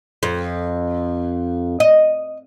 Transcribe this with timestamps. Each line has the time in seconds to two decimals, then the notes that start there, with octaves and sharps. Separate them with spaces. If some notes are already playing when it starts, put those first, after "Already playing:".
0.23 F2
1.80 D#5